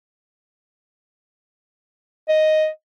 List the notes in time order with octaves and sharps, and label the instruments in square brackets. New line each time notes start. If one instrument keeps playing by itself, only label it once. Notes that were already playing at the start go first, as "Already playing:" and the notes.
[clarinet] D#5